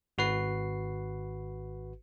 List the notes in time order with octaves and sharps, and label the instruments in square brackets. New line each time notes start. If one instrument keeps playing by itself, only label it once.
[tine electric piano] G#1 F#4 B4 C7